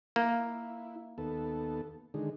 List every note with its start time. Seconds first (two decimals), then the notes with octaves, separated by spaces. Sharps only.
0.16 A#3 E4
1.18 D#2 B3 A4
2.14 D3 D#3 G#3